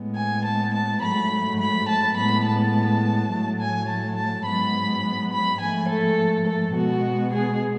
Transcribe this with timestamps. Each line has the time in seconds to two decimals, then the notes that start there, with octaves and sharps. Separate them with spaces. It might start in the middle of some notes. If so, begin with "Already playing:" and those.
Already playing: A2 G#3 B3
0.16 G#5
0.45 A5
0.73 A5
1.02 G#2 F#3 A3 B5
1.60 B5
1.88 A5
2.17 A2 G#3 B3 B5
2.45 A5
3.31 A2 F#3 A3
3.60 G#5
3.89 A5
4.17 A5
4.46 G#2 F#3 B3 B5
5.32 B5
5.61 G#2 F3 A3 G#5
5.89 A4
6.47 A4
6.75 B2 G#3 B3 F#4
7.33 G#4